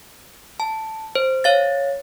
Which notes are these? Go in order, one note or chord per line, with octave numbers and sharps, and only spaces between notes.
A5
C5
C#5 F5 A6